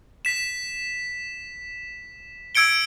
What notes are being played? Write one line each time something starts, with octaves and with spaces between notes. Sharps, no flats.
B6 E7
E6 G#6 C#7 D7 G7